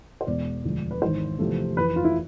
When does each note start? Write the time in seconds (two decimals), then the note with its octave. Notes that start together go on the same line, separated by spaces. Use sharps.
0.21 C5
0.27 E1 E2 B2 G#3 B3 D5
0.64 E1 D2 D3 F3 G#3
0.91 B4
1.01 G#1 G#2 E3 C5
1.39 E2 C3 F3 A3
1.76 F1 F2 E3 B4
1.96 F4
2.04 E4